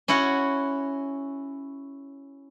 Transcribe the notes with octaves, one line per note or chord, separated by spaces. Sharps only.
C#4 E4 F#4 C#5